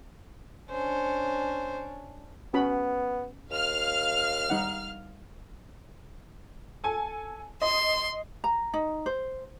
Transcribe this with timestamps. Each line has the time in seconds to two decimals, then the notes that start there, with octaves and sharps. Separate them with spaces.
0.71 C#4 D4 C5
2.54 B3 C#4 F#4 B5
3.50 D#2 F5 F6
4.50 G3 D#4 F#5
6.84 A4 G#5
7.62 D#5 C6
8.44 A#5
8.74 D#4
9.06 C5